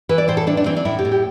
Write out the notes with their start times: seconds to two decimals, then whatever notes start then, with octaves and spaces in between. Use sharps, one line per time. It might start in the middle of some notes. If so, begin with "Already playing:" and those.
0.09 E3 B4
0.18 D5
0.28 A2 C5
0.37 A4
0.47 A2 D4
0.57 D4
0.66 E3 C4
0.76 D4
0.85 A2 E4
0.99 G4
1.05 A2
1.12 G4